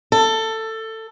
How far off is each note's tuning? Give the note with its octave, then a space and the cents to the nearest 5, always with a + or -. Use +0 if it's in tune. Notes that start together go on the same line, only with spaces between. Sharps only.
A4 +15